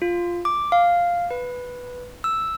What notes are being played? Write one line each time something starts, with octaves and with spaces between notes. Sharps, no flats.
F4
D6
F5
B4
E6